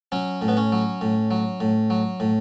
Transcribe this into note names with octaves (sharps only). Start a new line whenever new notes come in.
F#3 C#4
A2
B3
C#4
F#3
A2
F#3
A2
F#3
A2